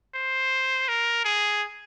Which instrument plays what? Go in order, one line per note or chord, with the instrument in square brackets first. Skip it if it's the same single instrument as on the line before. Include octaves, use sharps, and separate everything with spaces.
[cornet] C5
A#4
G#4